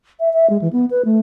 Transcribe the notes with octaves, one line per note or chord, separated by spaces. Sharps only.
E5
E5
G#3
E3
B3
B4
A3